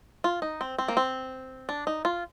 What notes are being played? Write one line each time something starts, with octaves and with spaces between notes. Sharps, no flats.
F4
D#4
C4
C4
A#3
C4
D4
D#4
F4